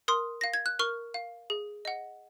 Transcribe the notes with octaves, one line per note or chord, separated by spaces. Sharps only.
A#4 C6 D#6
F5 A#6
G#6
F#6
A#4 C#6 F6
F5
G#4
D#5 F#5